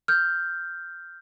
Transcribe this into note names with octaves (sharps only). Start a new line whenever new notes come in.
F6 G6